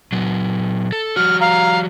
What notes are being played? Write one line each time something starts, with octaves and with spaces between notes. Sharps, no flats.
A#2 F#3
A4
F3 G3 F#4 F6
F5 A#5